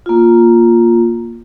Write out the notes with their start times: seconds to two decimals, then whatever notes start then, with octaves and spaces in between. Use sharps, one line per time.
0.06 A#3 F4